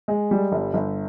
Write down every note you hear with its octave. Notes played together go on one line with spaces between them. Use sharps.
G#3
G3
G1
G1